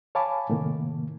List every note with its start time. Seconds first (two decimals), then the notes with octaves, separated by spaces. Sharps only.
0.15 C#5 F5 G#5 A5 B5 D6
0.50 A2 C3 D#3 A#3